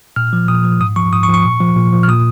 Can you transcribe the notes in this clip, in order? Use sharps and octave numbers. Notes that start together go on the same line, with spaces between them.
A#2 F6
F3
A#2 D#6
F3
G#2 D#6
F3 C#6
G#2 D#6
C#6
F3
C#6
A#2
F3
A#2
F3
F6
A#2 D#6